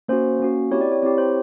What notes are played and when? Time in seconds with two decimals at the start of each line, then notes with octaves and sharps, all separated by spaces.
0.08 A#3 C#4 F#4 C5
0.40 A#3 C#4 F#4
0.71 C4 E4 G4 C#5
0.81 D5
0.92 C#5
1.02 C4 E4 G4 C#5
1.18 C5